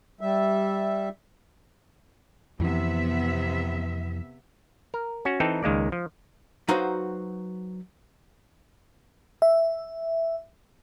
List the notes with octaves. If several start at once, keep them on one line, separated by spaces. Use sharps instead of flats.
G3 E5
F2 C3 E3 B3 E5
A#4
C#4 F#4
E3 C4 D#4 A4 G5 A#5
C#2 D#3 G#3 A#3 D5
F3
F#3 D#4 F#4 B4 C5 F5
E5